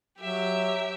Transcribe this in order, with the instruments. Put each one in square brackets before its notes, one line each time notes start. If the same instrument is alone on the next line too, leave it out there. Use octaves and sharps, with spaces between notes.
[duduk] F#3 [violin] G4 E5